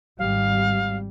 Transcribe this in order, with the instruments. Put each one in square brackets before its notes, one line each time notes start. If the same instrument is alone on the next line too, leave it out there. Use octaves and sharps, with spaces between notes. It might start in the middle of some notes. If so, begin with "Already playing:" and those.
[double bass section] G#1 G3 [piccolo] F5